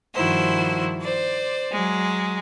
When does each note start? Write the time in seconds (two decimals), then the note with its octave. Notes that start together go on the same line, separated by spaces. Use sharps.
0.15 G2 D#3 F3 E4 F#4 C5
1.01 C5 D5
1.72 F#3 G#3